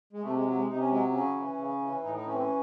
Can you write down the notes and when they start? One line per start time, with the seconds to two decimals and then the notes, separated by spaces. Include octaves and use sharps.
0.13 G#3
0.22 C3 A3
0.34 G#3
0.45 F#3
0.56 G#3
0.67 C3 D#4
0.79 C#4
0.90 F#3 G#3
1.12 C#3 C#4
1.36 E3
1.58 C#3
1.81 E3
2.03 A2 D#4
2.15 D#4
2.26 E3 C#4
2.33 C4
2.37 C#4